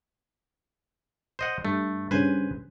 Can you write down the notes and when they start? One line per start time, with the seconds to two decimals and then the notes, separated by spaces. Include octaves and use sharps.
1.39 C5 D#5 F#5
1.65 G2 A3
2.11 G2 C#3 B4 C5 G#5